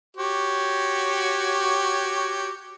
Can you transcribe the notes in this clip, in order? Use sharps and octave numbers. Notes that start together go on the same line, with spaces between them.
F#4 G4 C#5